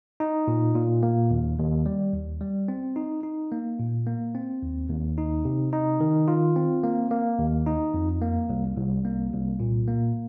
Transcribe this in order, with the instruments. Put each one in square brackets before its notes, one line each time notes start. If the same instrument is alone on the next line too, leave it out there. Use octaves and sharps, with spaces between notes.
[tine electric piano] D#4
A#2
A#2
A#3
D#2
D#2
G3
D#2
G3
C4
D#4
D#4
A#3
A#2
A#3
C4
D#2
D#2
D#4
C3
D#4
D#3
F4
C4
A#3
A#3
D#2
D#4
F2
A#3
C2
C2
A#3
C2
A#2
A#3